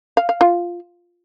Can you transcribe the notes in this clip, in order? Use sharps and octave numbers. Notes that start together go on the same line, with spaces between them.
F5
F5
F4